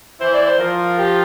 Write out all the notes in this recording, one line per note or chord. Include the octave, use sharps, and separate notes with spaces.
E3 E4 C5
D5
C5
F3 F4 A#4
G4